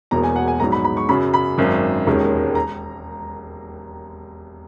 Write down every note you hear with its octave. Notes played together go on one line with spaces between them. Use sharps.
E1 E2 B2 A#3 A#5
G#5
F#5
G#5
A#1 G#2 F#3 B3 D#4 A#5
B5
B5
C#6
F#2 C#3 F#3 B5
B5
G#1 F#2 D#3
E1 D#2 D#3 G#3 C#4
A#5